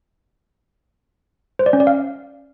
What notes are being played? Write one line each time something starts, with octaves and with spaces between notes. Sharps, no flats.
C5
D5
C#4
D5
F5